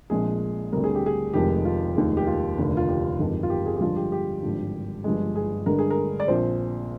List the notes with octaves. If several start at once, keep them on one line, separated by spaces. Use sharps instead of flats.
A#1 A#2 F3 G#3 C4 G#4
D2 D3 G3 C4 A#4
G#4
G4
G#4
F1 F2 D#3 G#3 G4
F4
F1 D#2 D#3 G#3
G4
F4
F1 D#2 D3
F4
G4
G1 F2 D#3 G#3
F4
G4
G#4
G4
G2 D3 F3 G#3 F4
G4
G4
G#1 G2 D3 F3
G1 G2 F3 G#3
G#4
G2 D3 G#3 A#4
G#4
A#4
D5
A#1 A#2 F3 C4 C5